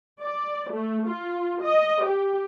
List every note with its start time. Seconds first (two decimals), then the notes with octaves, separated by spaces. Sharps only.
0.22 D5
0.72 A3
1.08 F4
1.63 D#5
2.05 G4